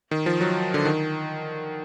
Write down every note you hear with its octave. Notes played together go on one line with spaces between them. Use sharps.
D#3
F3
F#3
D3
D#3